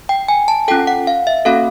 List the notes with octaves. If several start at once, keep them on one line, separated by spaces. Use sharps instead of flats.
G5
G#5
A5
C#4 F4 A4 G5
F#5
F5
E5
A#3 C#4 F#4 A4 F5